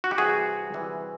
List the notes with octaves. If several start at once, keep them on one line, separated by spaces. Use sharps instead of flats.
F#4
G4
C3 E3 G3 F#4 G#4
C3 E3 G3